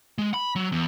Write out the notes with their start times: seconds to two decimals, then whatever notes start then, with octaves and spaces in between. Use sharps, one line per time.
0.18 G#3
0.34 B5
0.56 F#3
0.72 E2